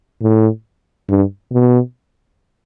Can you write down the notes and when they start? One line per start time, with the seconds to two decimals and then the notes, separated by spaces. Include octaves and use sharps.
0.22 A2
1.09 G2
1.52 B2